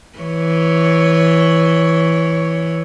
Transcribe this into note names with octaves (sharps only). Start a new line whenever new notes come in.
E3 C#5